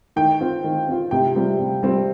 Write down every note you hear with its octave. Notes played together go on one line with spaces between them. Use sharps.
D#3 G5
C4 F4
D#3
C4 F4
C3 G5
G3 C4 F4
C3
G3 C4 F4